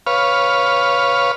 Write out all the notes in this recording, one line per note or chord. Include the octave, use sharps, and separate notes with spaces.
B4 C#5 F5